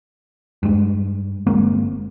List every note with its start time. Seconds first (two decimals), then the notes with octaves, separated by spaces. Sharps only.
0.63 G2 G#3
1.47 G1 G#3 A#3 C4